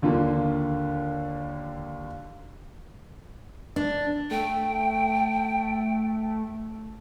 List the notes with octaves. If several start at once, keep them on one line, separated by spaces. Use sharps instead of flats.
D#2 D3 A#3 F4
D4
A3 G5